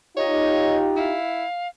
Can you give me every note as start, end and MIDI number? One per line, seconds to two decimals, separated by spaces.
0.17 1.14 63
0.17 1.14 65
0.17 1.14 67
0.17 0.81 73
0.17 0.76 75
0.96 1.45 64
0.96 1.67 77